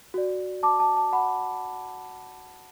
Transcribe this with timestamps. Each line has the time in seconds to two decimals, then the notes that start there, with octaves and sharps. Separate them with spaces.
0.14 F#4 D5
0.63 A5 D6
0.80 A5
0.97 A5
1.13 F#5 B5